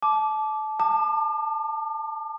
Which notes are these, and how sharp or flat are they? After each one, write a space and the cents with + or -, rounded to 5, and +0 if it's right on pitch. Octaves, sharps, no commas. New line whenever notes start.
A5 -25 D6 +0
A5 +20 D6 +40